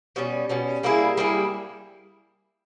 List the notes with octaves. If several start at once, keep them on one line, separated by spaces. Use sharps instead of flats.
B2 G3 C#4
B2 G3 C#4
G3 A#3 E4 G#4
G3 A#3 E4 G#4